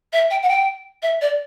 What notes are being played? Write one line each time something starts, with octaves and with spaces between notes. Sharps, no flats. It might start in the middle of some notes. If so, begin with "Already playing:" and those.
E5
G5
F#5
G5
E5
D5